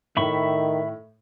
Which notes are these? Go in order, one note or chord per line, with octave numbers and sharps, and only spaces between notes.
A2 D#3 E5 B5 C#6